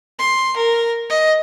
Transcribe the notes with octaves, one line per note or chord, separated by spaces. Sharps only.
C6
A#4
D#5